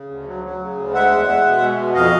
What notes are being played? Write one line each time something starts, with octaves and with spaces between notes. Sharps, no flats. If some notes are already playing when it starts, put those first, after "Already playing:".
Already playing: C#3
D2
F#3
F#3
C#3
D2
G#3 E5 F#5
E2
G#3
B2
G#3
B2
F2 D#5 F5